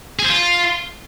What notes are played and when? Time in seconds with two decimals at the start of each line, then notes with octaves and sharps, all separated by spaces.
0.19 G#4
0.24 C5
0.30 F4